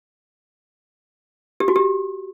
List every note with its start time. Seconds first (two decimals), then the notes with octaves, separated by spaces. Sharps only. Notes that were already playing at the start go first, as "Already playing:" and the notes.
1.60 G4
1.68 F#4
1.76 G4